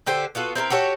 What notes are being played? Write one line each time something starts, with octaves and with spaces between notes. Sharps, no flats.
D3 G4 A4 C5
B3 F4 F#4 A4
C4 E4 A4 A#4
F#4 G4 A4 C#5